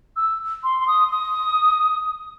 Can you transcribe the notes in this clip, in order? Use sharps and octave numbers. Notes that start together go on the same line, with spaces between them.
E6
C6
C6
D#6
D#6